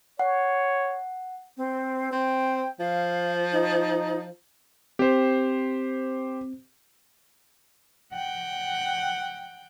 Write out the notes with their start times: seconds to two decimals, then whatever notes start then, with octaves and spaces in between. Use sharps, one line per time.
0.19 C#5 F#5
1.57 C4
2.12 C4 G5
2.80 F3 F5
3.52 D#4
4.99 C4 G4 C5
8.13 F#5 G5